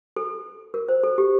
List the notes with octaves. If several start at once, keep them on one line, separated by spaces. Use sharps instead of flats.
A4
A#4
C5
A4
G4